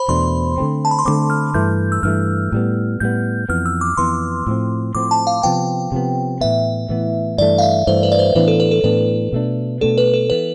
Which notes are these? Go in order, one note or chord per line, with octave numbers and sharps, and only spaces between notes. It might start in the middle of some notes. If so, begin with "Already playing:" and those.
Already playing: C5 B5
E2 B2 A3 D4 C6
D3 F3 A3 C4
A5
B5
C6
D3 F3 A3 C4 D6
F6
G2 E3 A3 G6
E6
G2 E3 A3 F6
A2 G3 B3
A2 G3 B3 G6
F2 E3 B3 F6
E6
D6
F2 E3 B3 C6
A2 F3 C4
A2 F3 C4 D6
A5
F5
C3 F3 B3 G5
C3 F3 B3
A2 E3 B3 E5
A2 E3 B3
G2 E3 A3 D5
F5
E5
G2 E3 A3 C5
B4
D5
C5
A2 E3 B3 D4 B4
A4
B4
A4
A2 E3 B3 D4 B4
B2 A3 D4
B2 A3 D4 A4
B4
A4
E3 B3 B4